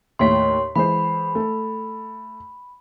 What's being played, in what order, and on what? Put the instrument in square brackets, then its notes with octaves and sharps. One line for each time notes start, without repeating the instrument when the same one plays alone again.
[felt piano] D#2 A2 B6 [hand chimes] C#5 C6
[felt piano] E3 G#3 C5 [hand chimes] B5
[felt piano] A3